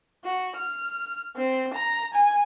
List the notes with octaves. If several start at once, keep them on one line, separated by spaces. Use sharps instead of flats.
F#4
F6
C4
A#5
G#5